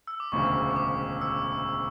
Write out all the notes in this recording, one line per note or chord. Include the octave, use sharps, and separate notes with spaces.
E6
D6
E1 D2 C#3 F3 C#6
C#6
D6
E6